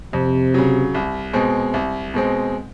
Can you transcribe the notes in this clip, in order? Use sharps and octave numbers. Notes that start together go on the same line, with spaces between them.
F2 C3
C#3 F#3
C2
B2 G#3 C4
C2
B2 G#3 C4